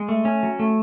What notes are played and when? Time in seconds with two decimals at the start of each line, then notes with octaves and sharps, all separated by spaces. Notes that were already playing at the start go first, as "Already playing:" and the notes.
Already playing: G#3
0.09 A3
0.25 C#4
0.43 F#3
0.59 A3